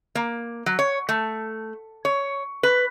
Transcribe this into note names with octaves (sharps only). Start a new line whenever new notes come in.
A#3
F#3
C#5
A3
C#5
B4